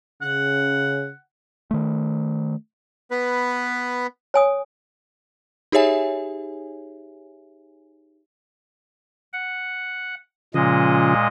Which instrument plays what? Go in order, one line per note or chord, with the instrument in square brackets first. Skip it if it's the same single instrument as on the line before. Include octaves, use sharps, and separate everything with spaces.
[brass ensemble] C#3 [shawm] F#5
[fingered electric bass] D#3 A3
[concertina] B3 B4
[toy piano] C#5 G#5 D#6
[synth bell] D#4 G4 G#4 C#5 E5 G#5
[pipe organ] F#5
[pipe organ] A#2 G#3 D#5 [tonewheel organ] C#3 F3